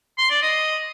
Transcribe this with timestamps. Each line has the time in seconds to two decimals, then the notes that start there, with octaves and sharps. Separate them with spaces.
0.18 C6
0.30 D5
0.42 D#5